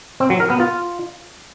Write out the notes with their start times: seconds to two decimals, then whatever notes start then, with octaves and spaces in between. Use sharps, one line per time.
0.20 C4
0.30 F#3
0.40 A#4
0.50 B3
0.60 F4